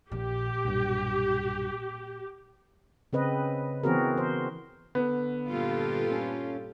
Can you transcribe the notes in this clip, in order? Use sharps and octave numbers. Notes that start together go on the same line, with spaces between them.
A#1 A#2 G4
B1 G2
C#3 C4 B4 D#5
E3 B3 C4 F#4 G#4 A#4
C5
D3 B3
G2 A#2 F4 G4 A4
C#4